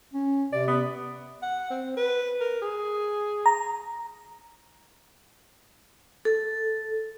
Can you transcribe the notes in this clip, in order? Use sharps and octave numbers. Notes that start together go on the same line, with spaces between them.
C#4
C3 D5
B3
F#5
C4
B4
A#4
G#4
A#5
A4